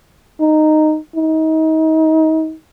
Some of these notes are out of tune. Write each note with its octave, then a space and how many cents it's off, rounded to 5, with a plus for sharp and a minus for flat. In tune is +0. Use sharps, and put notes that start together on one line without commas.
D#4 -10
D#4 +30